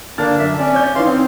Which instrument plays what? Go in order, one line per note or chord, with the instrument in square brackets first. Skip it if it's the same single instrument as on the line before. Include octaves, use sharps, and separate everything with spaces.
[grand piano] D3 F6 A6 [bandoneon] A#3 D4
[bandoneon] F#2 E5
[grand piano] C4 [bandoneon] C#4 D5
[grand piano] C#5 G6
[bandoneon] E3 F5 C6 [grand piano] C#4 D#4
[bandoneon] C4